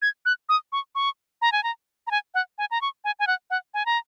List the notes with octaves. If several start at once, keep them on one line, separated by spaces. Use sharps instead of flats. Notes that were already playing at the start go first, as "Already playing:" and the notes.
G#6
F#6
D#6
C#6
C#6
A#5
G#5
A#5
A#5
G#5
F#5
G#5
A#5
C#6
G#5
G#5
F#5
F#5
G#5
A#5